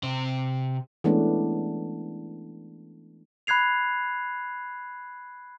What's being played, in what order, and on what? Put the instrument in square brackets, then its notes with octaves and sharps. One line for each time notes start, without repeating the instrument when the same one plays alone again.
[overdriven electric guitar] C3 C5
[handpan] E3 G#3 A3 B3 C#4 D4
[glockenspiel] B5 F#6 G#6 C7 F7